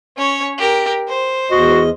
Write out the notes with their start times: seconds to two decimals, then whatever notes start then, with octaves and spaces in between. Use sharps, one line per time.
0.17 C#4 C#5
0.58 G4 A#4
1.08 C5
1.51 E2 F#4 D#5